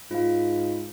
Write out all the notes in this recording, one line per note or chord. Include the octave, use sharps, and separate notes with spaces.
G#2 F4 F5